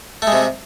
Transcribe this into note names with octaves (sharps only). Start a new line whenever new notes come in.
C3 G#3 A3